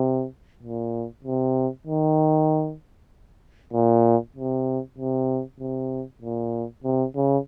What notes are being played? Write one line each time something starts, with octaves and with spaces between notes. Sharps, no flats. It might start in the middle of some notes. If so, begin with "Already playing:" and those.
Already playing: C3
A#2
C3
D#3
A#2
C3
C3
C3
A#2
C3
C#3